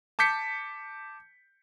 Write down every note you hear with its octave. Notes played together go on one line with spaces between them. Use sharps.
A5 D6 G6 B6 C#7